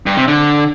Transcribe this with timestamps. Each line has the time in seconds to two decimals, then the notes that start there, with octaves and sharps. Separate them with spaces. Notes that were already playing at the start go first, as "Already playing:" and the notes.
0.06 G2
0.17 C3
0.28 D3